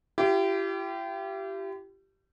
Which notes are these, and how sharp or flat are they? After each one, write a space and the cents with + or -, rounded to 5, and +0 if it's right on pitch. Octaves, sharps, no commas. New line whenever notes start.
E4 +45 G4 -15